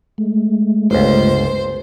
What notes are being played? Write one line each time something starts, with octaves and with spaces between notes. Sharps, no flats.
G#3 A3
G1 C#2 C5